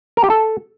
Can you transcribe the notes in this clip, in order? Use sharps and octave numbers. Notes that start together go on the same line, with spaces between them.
A#4
G4
A4